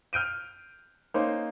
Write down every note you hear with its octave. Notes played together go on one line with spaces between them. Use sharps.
F6 G6 D7 D#7
A#3 C#4 D#4 C5